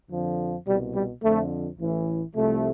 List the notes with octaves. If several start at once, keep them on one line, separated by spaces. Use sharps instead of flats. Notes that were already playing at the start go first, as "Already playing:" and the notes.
F2 D3 F3
C2 B2 G3
G3
F2 D3 F3 A3
A1 A2 E3
C2 C3 F3 A3